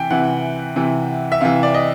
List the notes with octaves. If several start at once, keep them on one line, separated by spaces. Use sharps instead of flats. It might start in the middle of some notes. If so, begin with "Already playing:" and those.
Already playing: C3 E3 G5 G#5
C3 E3 F#5
C3 E3
E5
C3 E3 F5
D5
D#5